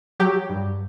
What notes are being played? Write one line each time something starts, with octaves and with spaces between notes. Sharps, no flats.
F#3 G4
G2